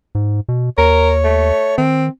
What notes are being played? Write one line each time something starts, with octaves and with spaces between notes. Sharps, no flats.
G#2
B2
D#2 A#4 C#5
A3
D#3 C4